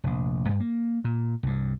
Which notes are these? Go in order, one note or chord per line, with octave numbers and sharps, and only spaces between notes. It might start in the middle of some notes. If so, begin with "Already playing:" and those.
F1 A#1
G2
A#3
A#2
C2 G2